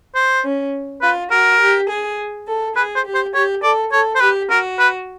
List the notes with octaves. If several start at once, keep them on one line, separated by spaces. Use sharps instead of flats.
C5
C#4
F4 B4
F#4 A#4
G4
G#4
A4
G#4 B4
C5
G4
C5
G4 C#5
A4 D5
A4 C#5
C5
G4 B4
F#4 A#4
B4